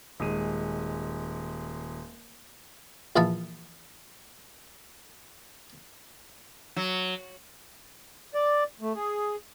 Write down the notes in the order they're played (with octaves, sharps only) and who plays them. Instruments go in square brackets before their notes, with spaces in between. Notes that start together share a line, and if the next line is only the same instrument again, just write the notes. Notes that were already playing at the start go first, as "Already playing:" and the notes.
[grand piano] D#1 G#3 D#7
[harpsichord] A#1 E3 B3 E5 F5 A5
[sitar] F#3
[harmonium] D5
A3
G#4